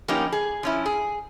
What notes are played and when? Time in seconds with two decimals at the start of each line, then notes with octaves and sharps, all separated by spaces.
0.08 F3 A#3 B3 C#4 D#4 G4
0.32 G#4
0.63 F3 C#4 E4
0.86 G#4